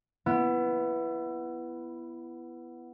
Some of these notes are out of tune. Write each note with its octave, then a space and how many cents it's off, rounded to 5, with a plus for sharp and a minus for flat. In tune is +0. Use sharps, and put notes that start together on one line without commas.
B3 +0 E4 +25